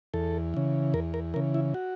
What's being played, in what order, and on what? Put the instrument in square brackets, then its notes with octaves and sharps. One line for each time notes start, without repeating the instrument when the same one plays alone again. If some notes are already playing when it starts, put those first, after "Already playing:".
[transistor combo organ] E2 A4
C#3 E3
E2 A#4
A#4
C#3 E3 A#4
E4
F#4